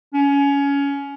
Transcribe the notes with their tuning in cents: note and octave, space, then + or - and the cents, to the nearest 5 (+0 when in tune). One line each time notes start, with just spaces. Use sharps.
C#4 +20